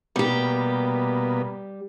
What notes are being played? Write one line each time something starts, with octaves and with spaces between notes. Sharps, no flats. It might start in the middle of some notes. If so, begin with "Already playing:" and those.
B2 G3 A#3 B3 G4